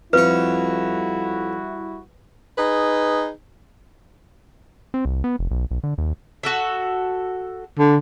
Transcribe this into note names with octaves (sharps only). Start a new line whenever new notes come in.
F2 G3 E4 F#4 B4 C#5
D#4 G#4 B4
C4
C2
B3
F1
B1
B1
D3
D#2
F#4 A4 E5
D3